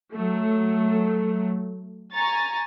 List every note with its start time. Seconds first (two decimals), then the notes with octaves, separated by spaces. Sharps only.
0.13 F#3 A3
2.13 G#5 A#5 C#6 A6